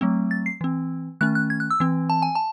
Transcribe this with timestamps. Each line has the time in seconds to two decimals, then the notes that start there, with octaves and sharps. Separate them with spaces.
0.01 F#3 A3 C4
0.31 A6
0.46 C7
0.61 E3 C4
1.21 D#3 A3 C#4 F#6
1.35 F#6
1.50 G#6
1.60 F#6
1.70 E6
1.80 E3 C4
2.10 A5
2.22 G#5
2.35 A5